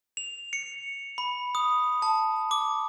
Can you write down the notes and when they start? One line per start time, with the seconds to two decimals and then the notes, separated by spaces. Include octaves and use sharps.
0.17 F7
0.53 C#7
1.18 B5
1.55 D#6
2.02 A5
2.51 D6